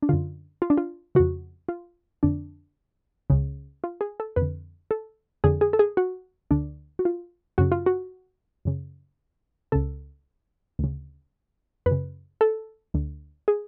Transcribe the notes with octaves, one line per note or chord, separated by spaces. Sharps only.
D4
F#2 D3 F4
F4
D4
F4
F2 C#3 F#4
F4
F2 D3 D4
C#2 C#3
F4
G#4
A4
F2 B4
D3
A4
F2 D3 G#4
G#4
A4
G#4
F#4
D2 D3 D4
F#4
F4
F#2 C#3 F#4
F4
F#4
F#2 C#3
C#2 C#3 A4
D2 C#3
F#2 B4
C#3
A4
D2 D3
G#4